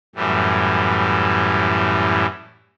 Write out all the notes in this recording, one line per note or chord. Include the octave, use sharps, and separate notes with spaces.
F#2 A2 E3 G3